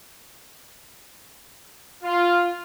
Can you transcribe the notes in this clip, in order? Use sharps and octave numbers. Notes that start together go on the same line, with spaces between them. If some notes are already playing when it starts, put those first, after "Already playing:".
F4